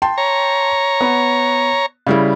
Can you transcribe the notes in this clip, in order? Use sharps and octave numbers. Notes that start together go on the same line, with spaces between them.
G5 A5 C6
C#5 A#5
B3
C#3 G3 E4